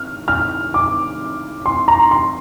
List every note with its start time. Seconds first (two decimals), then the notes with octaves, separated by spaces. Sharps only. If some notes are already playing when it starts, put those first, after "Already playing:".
Already playing: F6
0.28 F6
0.74 D6
1.66 C6
1.88 A#5
2.11 C6